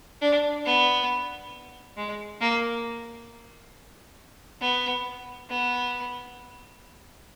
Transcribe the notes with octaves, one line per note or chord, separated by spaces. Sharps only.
D4
B3
G#3
A#3
B3
B3